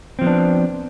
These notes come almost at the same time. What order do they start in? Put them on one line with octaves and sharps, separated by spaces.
C4 F3 B3 D4